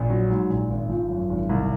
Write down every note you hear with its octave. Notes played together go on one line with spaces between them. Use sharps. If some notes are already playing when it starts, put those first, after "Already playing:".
Already playing: A#1
F#3
G#2
A#1
G#1
F3
F#2
G#1
C2